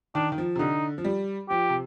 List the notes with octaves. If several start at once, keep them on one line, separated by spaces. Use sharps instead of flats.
D#3 D4
D#3
F3
C3
D3 D#4
F3
G3
F3 G4
C3